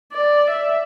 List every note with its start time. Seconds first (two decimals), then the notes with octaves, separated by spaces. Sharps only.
0.13 D5
0.50 E5